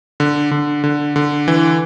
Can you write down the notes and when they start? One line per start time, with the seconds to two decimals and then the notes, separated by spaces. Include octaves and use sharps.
0.20 D3
0.51 D3
0.84 D3
1.16 D3
1.48 E3